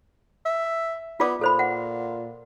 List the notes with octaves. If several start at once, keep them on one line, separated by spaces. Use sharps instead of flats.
E5
B3 F4 D5 D6
A#2 A4 C5 B5
F#5